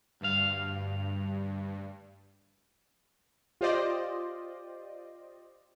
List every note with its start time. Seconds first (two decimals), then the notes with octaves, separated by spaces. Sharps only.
0.21 D2 G2 F5
3.61 F4 G4 C5 D5 D#5